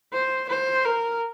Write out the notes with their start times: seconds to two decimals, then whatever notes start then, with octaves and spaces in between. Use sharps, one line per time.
0.13 C5
0.49 C5
0.85 A#4